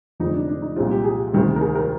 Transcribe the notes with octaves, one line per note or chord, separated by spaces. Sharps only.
F1 F2 D3 G#3 D#4
D4
D4
D#4
C2 A#2 G#3 C4 F4
G4
G#4
D2 C3 D#3 G#3
A#4
G#4
A#4